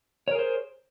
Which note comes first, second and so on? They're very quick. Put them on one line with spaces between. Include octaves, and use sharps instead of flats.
C#5 A#4 G#4 C5